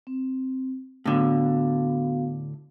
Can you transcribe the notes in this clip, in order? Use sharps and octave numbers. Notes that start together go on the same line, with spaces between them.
C4
A2 D3 B3 F#4 F5